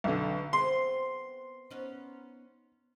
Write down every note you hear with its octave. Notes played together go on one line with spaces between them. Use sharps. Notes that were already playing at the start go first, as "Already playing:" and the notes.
B1 D3
B3 C4 G#4 C6
B3 C#4 D#4